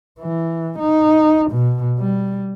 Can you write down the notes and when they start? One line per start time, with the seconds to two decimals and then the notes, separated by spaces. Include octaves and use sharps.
0.20 E3
0.79 D#4
1.51 B2
1.99 G3